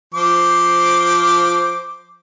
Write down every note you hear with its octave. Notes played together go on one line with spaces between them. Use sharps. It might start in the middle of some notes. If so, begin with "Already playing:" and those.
F3 C5 D6